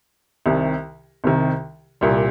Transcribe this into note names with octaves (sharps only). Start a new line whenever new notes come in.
C2 C3 D#3
C2 C3 D#3
C2 A#2 G3